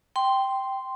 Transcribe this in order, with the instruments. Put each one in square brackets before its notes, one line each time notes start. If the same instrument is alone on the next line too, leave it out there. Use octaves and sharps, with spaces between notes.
[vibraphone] G5 C6